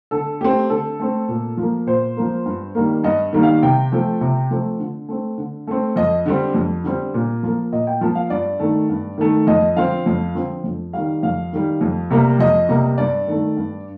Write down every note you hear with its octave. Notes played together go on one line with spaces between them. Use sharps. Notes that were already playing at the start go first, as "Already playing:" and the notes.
D3 A4
A3 C4 G4
D3 A4
A3 C4
A#2
F3
A#3
A#2 C5
F3 A#3
G2
D#3 G3 A#3
G2 D#5
D#3 G3 A#3
F5
C3 G5
F3 A3 C4
C3
F3 A3 C4
D3
A3 C4
D3
A3 C4
F2 D#5
D3 G3 C4
F2
D3 G3 C4
A#2
F3 A#3
A#2 D#5
G5
F3 A#3 A5
F5
G2 D5
D#3 A3
G2
D#3 A3
F2 D#5
D3 F3 C4 F5
F2
D3 F3 C4
F2
D#3 G3 F5
F2 F5
D#3 G3
F2
C3 G3 A#3
F2 D#5
C3 G3 A#3
G2 D5
D#3 A3
G2